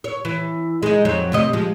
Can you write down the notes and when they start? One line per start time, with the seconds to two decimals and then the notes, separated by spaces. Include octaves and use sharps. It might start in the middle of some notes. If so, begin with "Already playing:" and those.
0.04 C#5
0.25 E3
0.83 G#3 D#4
1.05 F2 F#3
1.32 D2 C3 D#5
1.53 F3 G#3